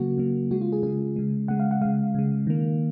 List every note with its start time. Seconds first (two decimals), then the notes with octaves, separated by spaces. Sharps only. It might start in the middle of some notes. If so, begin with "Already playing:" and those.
Already playing: C#3 F#3 A#3 F#4
0.18 C#3 F#3 A#3
0.51 C#3 G#3 F#4
0.61 F4
0.72 G#4
0.83 C#3 G#3 G#4
1.16 C#3 G#3
1.48 C#3 G#3 F#5
1.60 F5
1.71 F#5
1.81 C#3 G#3 F5
2.15 C#3 G#3
2.47 D#3 A#3